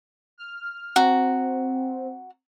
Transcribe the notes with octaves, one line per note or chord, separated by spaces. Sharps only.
F6
C4 F#4 A#5